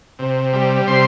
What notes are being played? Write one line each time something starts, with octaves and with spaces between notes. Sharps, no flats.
C3
G3
C3 C6